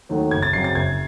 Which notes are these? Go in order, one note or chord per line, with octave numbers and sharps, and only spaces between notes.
D#2 D#3 F#3 A3
F#1 G#6
A6
F#2 C#3 F#3 C4 C7
A6
F#1 G#6